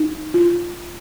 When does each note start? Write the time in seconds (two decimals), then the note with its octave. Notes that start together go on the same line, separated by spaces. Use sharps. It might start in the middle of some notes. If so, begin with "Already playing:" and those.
Already playing: D#4
0.34 F4